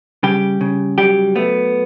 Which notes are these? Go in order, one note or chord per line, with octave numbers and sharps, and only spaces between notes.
C#3 G3 G4
C#3
F#3 G3 G4
A3 B3